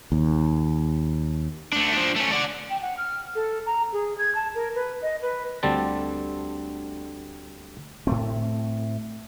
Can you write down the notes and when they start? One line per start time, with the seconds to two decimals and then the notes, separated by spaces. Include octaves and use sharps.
0.12 D#2
1.73 A3 D4
1.93 F3 D4
2.16 A3 C#4
2.32 D5 F#5
2.70 G5
2.82 F#5
2.97 F6
3.35 A4
3.66 A#5
3.92 G#4
4.18 G#6
4.35 A5
4.55 A#4
4.75 B4
5.02 D#5
5.22 B4
5.63 D2 D3 G3 C4 A5
8.07 A2 A3 C4